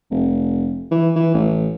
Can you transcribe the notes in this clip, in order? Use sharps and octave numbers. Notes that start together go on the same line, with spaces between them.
F1
E3
E3
A1